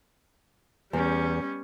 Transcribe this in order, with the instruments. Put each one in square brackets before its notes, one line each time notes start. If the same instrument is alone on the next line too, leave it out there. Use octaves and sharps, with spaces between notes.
[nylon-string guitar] E2 [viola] G3 C#4